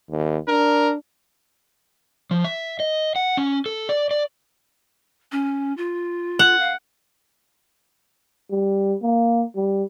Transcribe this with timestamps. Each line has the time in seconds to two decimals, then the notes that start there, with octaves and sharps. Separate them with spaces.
0.10 D#2
0.48 D4 A#4
2.31 F3
2.44 E5
2.80 D#5
3.16 F#5
3.37 C#4
3.66 A4
3.89 D5
4.11 D5
5.32 C#4
5.77 F4
6.39 F#5
6.60 F5
8.50 G3
9.02 A#3
9.56 G3